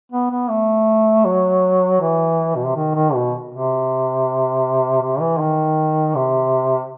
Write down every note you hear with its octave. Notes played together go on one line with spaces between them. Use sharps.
B3
B3
A3
F#3
E3
B2
C3
D#3
D#3
B2
C3
C3
E3
D#3
C3